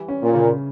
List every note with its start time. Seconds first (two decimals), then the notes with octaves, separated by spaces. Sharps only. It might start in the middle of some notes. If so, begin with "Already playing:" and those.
Already playing: E3 G3
0.08 C#4
0.22 A#2
0.34 C#3